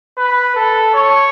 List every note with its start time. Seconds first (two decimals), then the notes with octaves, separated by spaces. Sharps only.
0.18 B4
0.56 A4
0.94 C#5